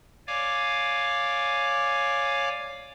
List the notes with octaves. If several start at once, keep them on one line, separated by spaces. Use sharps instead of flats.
C#5 D5 F5 G#5 D6